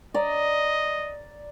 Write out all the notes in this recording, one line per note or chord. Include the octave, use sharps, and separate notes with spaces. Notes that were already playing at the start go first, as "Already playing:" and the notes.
D5 D#5 A#5